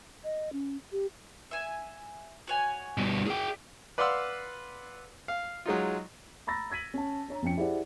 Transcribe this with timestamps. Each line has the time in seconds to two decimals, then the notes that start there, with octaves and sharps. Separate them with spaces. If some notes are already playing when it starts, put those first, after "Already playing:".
0.24 D#5
0.53 C#4
0.92 G4
1.51 E5 G#5
2.47 F#4 C#5 G#5
2.97 G2 B2
3.27 G#4 D5 E5 G5
3.98 B4 D5 F5 F#5 C6 E6
5.28 F5
5.66 F#3 G#3 D#4 F4
6.47 A#5 B5 E6 A6 A#6
6.70 E6 G#6 B6 D#7 F#7
6.94 C#4 A5
7.28 D4 C#5 A#5
7.42 F2 F3 C#4 G5 C#7
7.57 E4 G4 G#4 C5 D5 F#5